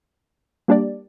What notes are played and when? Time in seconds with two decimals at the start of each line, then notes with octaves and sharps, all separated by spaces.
0.68 G3 A#3 D4 G4 D5